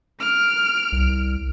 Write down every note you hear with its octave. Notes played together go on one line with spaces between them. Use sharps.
F6 D7
C2